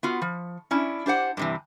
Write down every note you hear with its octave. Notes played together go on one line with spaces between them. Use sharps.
B3 F4 F#4
F3
C#4 D4 E4
D4 G4 C5 F#5
G2 C3 E3